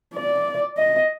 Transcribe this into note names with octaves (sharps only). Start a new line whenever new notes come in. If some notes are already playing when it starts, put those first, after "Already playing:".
D5
D#5